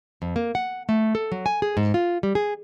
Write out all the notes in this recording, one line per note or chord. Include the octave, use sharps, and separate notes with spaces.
F2
A#3
F#5
A3
A4
F#3
G#5
G#4
G#2
F4
G3
G#4